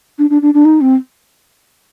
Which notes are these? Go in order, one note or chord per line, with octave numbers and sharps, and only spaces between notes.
D4
D4
D4
D4
D#4
C4